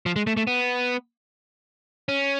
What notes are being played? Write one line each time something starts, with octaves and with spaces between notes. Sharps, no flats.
F3
G#3
A3
A3
B3
C#4